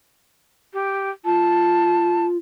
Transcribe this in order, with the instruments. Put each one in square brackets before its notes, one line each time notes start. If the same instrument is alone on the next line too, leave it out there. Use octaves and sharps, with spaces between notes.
[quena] G4
[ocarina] F4 [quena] A5